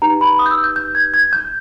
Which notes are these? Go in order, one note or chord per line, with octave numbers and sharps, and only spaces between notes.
D#4 G4 B4 A#5
B5
D#6
G6
E6
G6
G6
G#6
G#6
G6